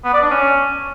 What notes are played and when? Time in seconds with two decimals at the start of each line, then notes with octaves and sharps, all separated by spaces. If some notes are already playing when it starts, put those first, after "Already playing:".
0.04 B3
0.13 D5
0.22 D4
0.31 C#4